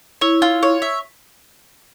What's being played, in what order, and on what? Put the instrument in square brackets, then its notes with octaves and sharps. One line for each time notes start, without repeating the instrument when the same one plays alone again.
[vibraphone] E4 [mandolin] C#5
[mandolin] F4
C#5
E5